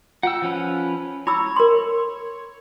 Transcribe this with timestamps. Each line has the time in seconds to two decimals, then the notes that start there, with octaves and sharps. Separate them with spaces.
0.23 F4 F#5 G5 E6
0.42 F3 C#4 B4
1.27 E4 C#5 B5 E6
1.56 A#4 C6